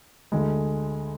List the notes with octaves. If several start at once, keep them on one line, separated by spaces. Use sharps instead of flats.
D2 D3 G#3